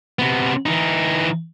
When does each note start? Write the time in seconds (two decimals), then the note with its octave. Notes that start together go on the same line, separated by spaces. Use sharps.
0.19 C3 B3
0.66 E3 D#4